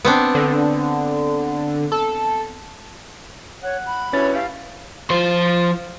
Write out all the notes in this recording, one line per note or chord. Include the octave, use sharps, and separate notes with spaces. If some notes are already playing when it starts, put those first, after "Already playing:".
B3 C4 D4
D3
A4
C#5 F#5
B5
G2 B2 C#4 E4 B4 C#5 A6
A3 C#4 G4 F5
F3 C5